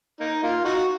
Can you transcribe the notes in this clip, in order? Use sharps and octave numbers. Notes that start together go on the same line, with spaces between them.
A#3 D#4
A#3 F4
D#4 F#4